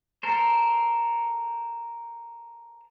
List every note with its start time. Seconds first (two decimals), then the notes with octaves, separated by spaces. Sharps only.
0.23 A4 A#4 C5